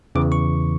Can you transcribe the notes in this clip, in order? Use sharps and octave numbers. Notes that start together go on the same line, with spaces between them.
E2 C#3 E3 D6
C#6